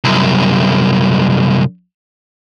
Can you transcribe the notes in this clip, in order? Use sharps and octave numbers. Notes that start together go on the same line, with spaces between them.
C2 F#2